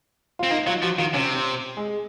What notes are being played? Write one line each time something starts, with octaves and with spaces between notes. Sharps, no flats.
C4 F4
A#3 D#4
F#3 F4
F3 F#4
D#3 F4
C3 C#4
C4
G#3